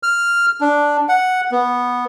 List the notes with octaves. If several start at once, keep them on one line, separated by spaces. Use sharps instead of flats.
F6
D4
F#5
B3